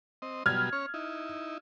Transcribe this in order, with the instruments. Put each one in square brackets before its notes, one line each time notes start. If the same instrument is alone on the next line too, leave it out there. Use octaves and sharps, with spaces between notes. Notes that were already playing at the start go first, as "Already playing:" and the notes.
[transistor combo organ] C4 D#5
[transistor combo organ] B2 F#3 G3 [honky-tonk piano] F6 G#6
[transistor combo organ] C#4 C#5
D#4 E4